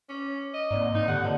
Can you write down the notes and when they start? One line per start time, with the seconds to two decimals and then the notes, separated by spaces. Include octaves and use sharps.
0.09 C#4 D6
0.54 D#5
0.71 G#2 A#3 C4 D5
0.95 G#2 D#4
1.08 D3 G4 F#5
1.24 F3 A#3 C#5 A5